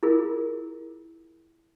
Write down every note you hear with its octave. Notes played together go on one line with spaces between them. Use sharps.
E4 F4 G#4 A#4